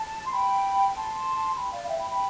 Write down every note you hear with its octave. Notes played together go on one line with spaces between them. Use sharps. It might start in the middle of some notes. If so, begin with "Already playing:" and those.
Already playing: A5
C6
G5 B5
A5 C6
G5 B5
D5 F5
F5
E5 G5
G5 B5
G5 B5